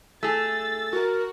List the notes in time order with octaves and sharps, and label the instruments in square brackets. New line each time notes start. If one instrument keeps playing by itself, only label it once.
[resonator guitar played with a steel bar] A3 G#4 [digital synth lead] E6 [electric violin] A6
[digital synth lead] F#4 [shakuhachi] A#4